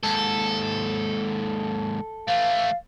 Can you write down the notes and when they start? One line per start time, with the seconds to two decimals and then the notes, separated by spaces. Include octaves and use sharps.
0.03 D#2 G#2 A4
2.28 E3 A3 F5